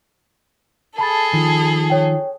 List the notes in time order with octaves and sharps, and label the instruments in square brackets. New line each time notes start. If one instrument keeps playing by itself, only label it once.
[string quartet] G#4 A4 [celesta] A5 B5 A6
[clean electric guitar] D#3 F3
[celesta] C#5 G5